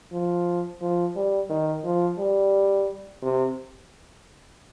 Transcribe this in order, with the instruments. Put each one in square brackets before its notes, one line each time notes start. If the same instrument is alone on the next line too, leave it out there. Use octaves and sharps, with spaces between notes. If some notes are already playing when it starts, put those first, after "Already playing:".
[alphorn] F3
F3
G3
D#3
F3
G3
C3